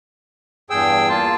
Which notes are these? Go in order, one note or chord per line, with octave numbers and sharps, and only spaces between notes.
E2 G2 G#4 G5 E6
A#3 F4 A5